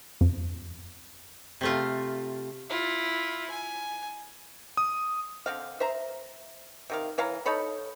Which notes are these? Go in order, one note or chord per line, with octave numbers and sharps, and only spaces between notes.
F2
C3 A3 F4
E4 F4
G#5
D#6
D3 C4 F5
C5 E5 A#5
C3 D#3 F5
E3 C#5 F5 A#5
D#4 A4 C#5 B5